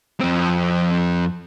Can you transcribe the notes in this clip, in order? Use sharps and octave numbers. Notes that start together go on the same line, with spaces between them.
F2 C4